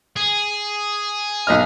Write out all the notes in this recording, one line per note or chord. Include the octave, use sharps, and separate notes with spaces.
G#4
B1 D#5 F6